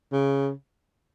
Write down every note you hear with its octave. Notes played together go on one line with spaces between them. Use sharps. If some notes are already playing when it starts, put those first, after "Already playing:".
C#3